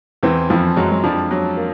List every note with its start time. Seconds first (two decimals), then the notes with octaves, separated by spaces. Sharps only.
0.23 E2 E3 C4
0.50 F2 E3 F3
0.76 F#2 F#3 G#3
0.92 F#3
1.04 F2 F3 D4
1.31 F#3
1.57 A#3